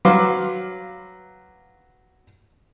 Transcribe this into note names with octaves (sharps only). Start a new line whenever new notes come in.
F#3 B4 F5 C6 D6